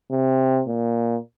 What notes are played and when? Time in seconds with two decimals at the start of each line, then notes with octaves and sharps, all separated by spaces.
0.11 C3
0.67 A#2